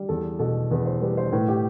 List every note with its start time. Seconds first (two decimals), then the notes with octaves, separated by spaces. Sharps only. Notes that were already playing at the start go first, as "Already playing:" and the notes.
Already playing: G3
0.09 E2 A4
0.39 B2 A4
0.71 E2 B4
0.86 C5
1.01 G3 B4
1.17 C5
1.32 A2 B4
1.48 G4